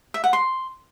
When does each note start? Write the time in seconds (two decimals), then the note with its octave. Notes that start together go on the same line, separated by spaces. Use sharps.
0.14 E5
0.24 F#5
0.33 C6